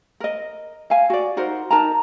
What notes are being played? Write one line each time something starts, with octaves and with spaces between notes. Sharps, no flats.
A#4 D#5
E5 F5 G#5
F#4 D5
D#4 F#4 A#4 C5
D#4 A#4 A5 A#5